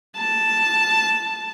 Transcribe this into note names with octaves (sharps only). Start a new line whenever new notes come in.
A5